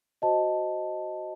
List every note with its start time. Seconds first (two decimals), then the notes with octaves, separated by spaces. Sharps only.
0.22 F#4 C5 D#5 A5